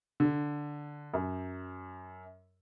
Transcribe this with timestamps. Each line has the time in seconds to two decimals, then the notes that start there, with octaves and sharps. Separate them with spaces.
0.20 D3
1.13 F#2